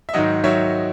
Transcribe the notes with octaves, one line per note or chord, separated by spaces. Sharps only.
E5
G#2 D#3 F#3 D#5 F#5
D#3 F#3 C#5 E5